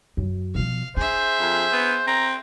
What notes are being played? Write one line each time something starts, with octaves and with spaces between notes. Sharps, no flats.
F#2
B2 F3 F5
D4 G#4 C5 E5
F2
B3
C4 A#5